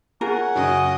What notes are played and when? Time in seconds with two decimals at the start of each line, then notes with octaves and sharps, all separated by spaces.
0.21 C#4 F4 G#4 A#4 F#5 G#5
0.55 F#2 C#3 D#5